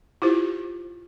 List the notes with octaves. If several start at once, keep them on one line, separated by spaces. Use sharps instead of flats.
E4 F4 G4 C5